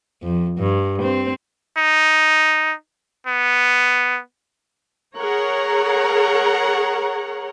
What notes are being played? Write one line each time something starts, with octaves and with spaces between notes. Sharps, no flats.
F2
G2
C4
D#4
B3
G#4 A#4 C#5 F#5 A#5